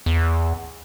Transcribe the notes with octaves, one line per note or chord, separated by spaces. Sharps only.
E2